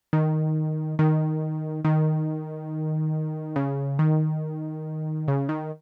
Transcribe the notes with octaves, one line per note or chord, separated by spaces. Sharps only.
D#3
D#3
D#3
C#3
D#3
C#3
D#3